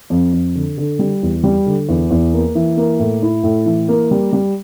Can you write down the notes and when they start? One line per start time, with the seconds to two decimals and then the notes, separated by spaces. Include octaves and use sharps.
0.10 F2
0.33 F2
0.55 D3
0.78 D3
0.99 G3
1.22 E2
1.44 G3
1.66 D3
1.89 E2
2.11 E2
2.33 A#3
2.55 E3
2.77 A#3
2.99 A2
3.22 E4
3.43 A2
3.66 E3
3.88 A#3
4.11 G3
4.33 G3